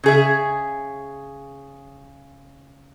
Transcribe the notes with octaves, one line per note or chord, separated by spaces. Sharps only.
C#3 G#4 E5